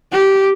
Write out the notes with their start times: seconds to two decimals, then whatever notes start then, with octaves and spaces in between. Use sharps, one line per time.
0.12 G4